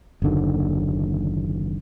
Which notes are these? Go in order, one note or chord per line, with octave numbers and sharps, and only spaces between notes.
F#1 D#2 D3 D#3